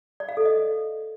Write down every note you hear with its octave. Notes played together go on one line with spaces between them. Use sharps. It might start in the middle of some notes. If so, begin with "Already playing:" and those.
D5
F5
A4
D#5